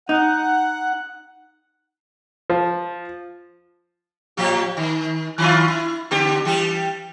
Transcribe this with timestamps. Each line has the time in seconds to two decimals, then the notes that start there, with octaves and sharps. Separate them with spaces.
0.09 D#4 F#5
2.50 F3
4.37 A2 F3 G4
4.77 D#3
5.38 D#3 E4 F4
5.68 E4
6.11 D3 B3 G4
6.45 E3 G3 G4